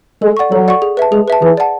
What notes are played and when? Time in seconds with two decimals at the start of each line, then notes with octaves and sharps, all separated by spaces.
0.22 G#3 A4
0.37 D5 F#5 C#6
0.51 F#3 A4
0.68 D5 F#5 C#6
0.82 G#4
0.97 B4 E5 A5
1.12 G#3 G#4
1.28 B4 E5 A5
1.42 E3 G#4
1.57 D5 F#5 A5